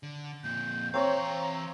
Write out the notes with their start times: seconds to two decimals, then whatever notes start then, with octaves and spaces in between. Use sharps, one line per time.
0.03 D3
0.44 F2 A#2 G6
0.94 E3 C4 C#5 F5 A#5 C#6